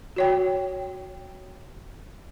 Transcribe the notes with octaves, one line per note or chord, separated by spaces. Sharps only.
F#4 C#5 G5